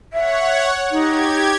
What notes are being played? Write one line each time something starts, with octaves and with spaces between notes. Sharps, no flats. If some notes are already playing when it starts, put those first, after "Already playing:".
C#5 E5 F#5
D#4 G4 G#6